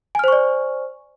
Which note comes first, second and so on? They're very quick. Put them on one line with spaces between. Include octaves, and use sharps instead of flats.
G#5 F6 C5 C#6 D5